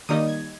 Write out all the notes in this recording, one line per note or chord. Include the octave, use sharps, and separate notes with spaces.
D#3 G3 A#3 D#4 D#6
G#6